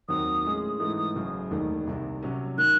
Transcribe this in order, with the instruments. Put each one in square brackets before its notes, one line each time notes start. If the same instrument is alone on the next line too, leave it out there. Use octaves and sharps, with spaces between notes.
[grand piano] D#2 D#3 F#3 C4 [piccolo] D#6
[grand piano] A2 G#3 C#4 G#4
[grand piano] G#2 E3 A3 D#4 [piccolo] D#6
[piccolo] D#6
[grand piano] F#1 F#2 C#3
E1 D#2 D#3 A3 D#4
C2 C3 D#3
C3 F#3 C#4
[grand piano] D#3 [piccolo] F#6